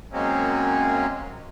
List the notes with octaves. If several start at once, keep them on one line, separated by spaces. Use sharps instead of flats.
F#2 F#3 G#3 A#3 C4 C#4